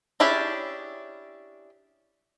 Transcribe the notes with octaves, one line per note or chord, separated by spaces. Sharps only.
C#4 D4 E4 G4 G#4